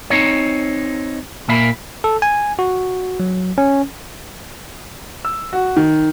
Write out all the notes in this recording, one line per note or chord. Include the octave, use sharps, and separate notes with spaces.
C4 D#4 C#5
A#2 A#3 E5 B5
A4
G#5
F#4
F#3
C#4
E6
F#4
D#3